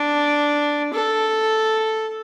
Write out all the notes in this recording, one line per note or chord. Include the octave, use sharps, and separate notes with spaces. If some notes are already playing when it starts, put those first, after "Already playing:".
Already playing: D4
A4